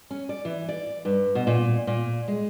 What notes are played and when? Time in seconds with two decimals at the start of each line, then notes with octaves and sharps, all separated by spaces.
0.11 C#4
0.29 D5
0.45 E3
0.69 D5
1.05 G2
1.35 B2
1.47 A#2
1.87 A#2
2.28 G#3